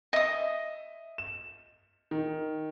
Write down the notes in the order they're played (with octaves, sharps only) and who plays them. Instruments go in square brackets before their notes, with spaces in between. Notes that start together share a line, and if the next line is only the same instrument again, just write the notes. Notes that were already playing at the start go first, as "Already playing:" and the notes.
[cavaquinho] D#5 D#6 [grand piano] E5
[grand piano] E7
D#3